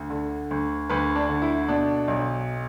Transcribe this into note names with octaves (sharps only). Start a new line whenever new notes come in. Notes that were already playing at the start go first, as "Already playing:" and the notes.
Already playing: D2
D3
D2
D2 B4
D4
D3
E4
B2 D4
B1